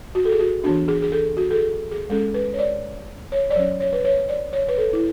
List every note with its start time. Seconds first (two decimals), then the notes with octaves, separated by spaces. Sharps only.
0.15 F#4
0.25 A4
0.32 G#4
0.40 F#4
0.64 E3 B3 D4 F#4
0.88 G#4
1.02 G#4
1.12 A4
1.37 F#4
1.51 A4
1.55 G#4
1.92 G#4
2.10 G#3 C#4 A4
2.34 B4
2.53 C#5
2.59 D5
3.32 C#5
3.50 D5
3.56 F#3 C#4 C#5
3.80 C#5
3.93 B4
4.05 C#5
4.29 D5
4.53 C#5
4.68 B4
4.78 A4
4.93 E4